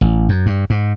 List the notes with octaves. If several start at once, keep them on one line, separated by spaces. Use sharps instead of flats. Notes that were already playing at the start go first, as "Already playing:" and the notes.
A1
F#2
G2
G#2